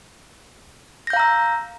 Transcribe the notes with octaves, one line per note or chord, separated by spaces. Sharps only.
F5 A#5 E6 G6 A#6